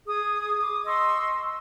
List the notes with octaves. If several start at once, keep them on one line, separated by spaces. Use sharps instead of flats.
G#4 D#6
D6 D#6
D#5 C6 C#6 E6